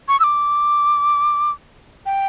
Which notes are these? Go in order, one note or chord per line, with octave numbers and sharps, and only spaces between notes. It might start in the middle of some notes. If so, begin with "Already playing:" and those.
C#6
E6
D6
G5